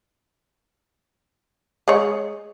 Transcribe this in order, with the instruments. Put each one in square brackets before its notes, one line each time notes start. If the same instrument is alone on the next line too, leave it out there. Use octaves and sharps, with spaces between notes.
[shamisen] G#3 G#4 C#5